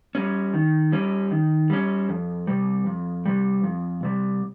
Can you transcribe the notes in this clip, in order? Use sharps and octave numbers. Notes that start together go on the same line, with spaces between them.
G3 C#4
D#3
G3 C#4
D#3
G3 C#4
F2
C3 G3
F2
C3 G3
F2
C3 G3